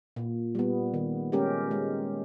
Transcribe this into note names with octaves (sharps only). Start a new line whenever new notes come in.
A#2
G3 B3
D#3
G#3 C#4 G4 A#4
G#3